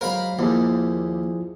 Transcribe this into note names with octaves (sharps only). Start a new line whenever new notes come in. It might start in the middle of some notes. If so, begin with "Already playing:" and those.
F#3 G#3 A#4 C5 F5 B5
D#2 F3 E4 G#4